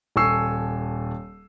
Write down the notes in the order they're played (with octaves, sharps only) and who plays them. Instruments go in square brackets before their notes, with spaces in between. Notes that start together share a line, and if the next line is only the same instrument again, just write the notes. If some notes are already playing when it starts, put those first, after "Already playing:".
[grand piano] D#1 A4 G#5 C#6 E6 C7